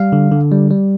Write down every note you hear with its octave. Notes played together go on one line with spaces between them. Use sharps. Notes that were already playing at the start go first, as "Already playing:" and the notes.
Already playing: G3 F5
D3
D3
G3
G3